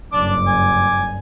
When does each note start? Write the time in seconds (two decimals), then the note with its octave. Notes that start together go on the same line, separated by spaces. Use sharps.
0.13 F#1 G2 D4 D6
0.47 G#5